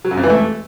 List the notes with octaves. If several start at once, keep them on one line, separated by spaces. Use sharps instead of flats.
F#3
F#2
F2
E3
A3